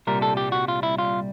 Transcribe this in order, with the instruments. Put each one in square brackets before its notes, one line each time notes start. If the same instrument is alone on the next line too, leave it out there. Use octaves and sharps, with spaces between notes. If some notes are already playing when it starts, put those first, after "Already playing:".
[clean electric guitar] C2 A#2 G3 A#4
A4
G4
F#4
F4
E4
F4